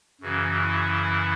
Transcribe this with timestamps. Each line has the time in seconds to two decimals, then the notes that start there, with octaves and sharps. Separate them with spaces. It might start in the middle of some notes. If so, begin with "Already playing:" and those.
0.21 F#2 C#3 E3 F#4
0.61 E4